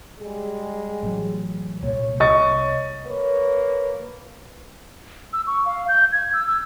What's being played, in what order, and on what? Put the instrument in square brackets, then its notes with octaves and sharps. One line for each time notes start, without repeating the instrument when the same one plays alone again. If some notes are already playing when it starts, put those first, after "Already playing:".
[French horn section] G3 G#3 G#4
[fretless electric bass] A1 F#3
[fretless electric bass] C2 A#2 [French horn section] C#5
[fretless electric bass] C2 [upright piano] D#5 C#6 A6
[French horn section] A#3 B4 C#5
[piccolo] E6
C#6
F5
G6
G#6
E6
E6